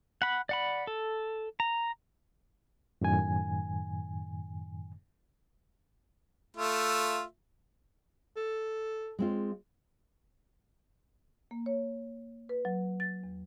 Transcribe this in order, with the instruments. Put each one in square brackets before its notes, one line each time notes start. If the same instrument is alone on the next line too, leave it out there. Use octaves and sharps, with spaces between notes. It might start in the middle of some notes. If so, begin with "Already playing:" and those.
[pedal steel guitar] F#5 B5
D5 F#5 B5
A4
A#5
[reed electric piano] F#2 A2 D#3 G#5
[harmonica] A3 F4 E5
[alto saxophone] A4
[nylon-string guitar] G#3 C4 F4
[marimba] A#3
C#5
B4
F#3
A6
E2